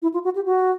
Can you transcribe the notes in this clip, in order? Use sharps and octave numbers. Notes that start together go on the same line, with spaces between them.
E4
F4
F#4
G4
F#4